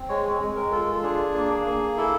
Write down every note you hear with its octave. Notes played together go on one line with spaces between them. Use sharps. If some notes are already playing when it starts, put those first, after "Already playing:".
Already playing: C4
G#3 C#5
G#3
A#4
F4 A4
D4 G#4
A#3
A#3
E4 A4